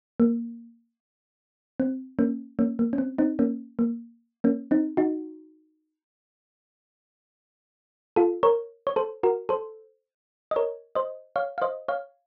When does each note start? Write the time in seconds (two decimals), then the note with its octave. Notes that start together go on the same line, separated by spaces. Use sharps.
0.20 A#3
1.80 C4
2.19 A#3 C#4
2.59 A#3 C#4
2.79 A#3
2.93 C#4
2.98 C4
3.18 C4 D#4
3.39 A#3 C#4
3.79 A#3
4.44 A#3 C#4
4.71 C4 D#4
4.97 D#4 F#4
8.16 F4 A4
8.43 A#4 C#5
8.87 C#5
8.96 A4 C5
9.23 F#4 A#4
9.49 A4 C5
10.51 D#5
10.56 A#4 C#5
10.95 C5 D#5
11.36 C#5 F5
11.58 F5
11.62 C5 D#5
11.88 C#5 F5